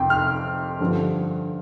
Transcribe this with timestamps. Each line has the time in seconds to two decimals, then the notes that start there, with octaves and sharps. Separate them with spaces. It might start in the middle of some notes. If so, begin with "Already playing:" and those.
Already playing: F2 C3 G5
0.10 F6
0.80 G2 D3 F3